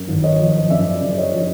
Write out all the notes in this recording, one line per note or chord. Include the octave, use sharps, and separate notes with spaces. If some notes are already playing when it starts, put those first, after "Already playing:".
Already playing: F#2
G#1
C#5 D#5
F3
F#2 D5 E5
F#1
C#5 D#5
F3